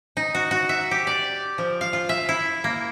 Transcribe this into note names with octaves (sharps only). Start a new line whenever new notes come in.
D#4
F#4
F#4
E5
G4
D5
F3
F5
F4
E5
E4
A#3